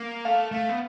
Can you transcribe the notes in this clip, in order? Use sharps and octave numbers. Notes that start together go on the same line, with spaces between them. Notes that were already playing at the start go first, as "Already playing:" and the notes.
Already playing: A#3
A3 F5
A3
B3